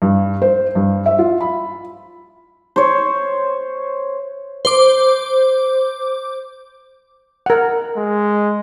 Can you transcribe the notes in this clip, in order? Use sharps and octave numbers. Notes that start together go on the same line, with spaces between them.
G2
C5
G2
E5
F4
B5
C5 C#5
C5 D6
A#4 F#5
G#3